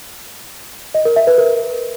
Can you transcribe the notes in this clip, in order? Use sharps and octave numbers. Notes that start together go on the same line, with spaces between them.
D#5
A#4
E5
B4
A#4